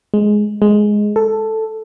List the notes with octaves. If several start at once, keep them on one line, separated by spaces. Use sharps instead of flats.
G#3
G#3
A4